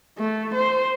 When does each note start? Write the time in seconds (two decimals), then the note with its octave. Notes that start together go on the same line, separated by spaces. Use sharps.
0.18 A3
0.55 C5